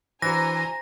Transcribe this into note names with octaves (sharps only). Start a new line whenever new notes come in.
E3 D4 F#4 C5 G#5 A#5 A#6